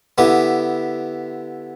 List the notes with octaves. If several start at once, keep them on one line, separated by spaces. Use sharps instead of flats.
D3 B3 E4 G4